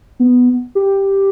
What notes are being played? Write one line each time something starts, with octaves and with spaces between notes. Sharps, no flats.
B3
G4